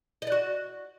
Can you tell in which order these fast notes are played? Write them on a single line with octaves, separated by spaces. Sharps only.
D#5 D5 F#4